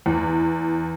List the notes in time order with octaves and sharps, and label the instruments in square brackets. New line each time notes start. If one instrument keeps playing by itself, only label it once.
[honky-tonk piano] E2